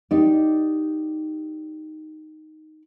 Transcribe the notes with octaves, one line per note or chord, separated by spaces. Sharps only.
D#4 G4 D5